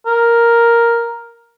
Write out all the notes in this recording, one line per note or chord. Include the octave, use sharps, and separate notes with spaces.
A#4